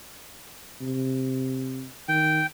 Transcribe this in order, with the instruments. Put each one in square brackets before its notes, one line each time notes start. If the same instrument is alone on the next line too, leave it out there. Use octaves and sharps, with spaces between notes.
[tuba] C3
[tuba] D#3 [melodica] G5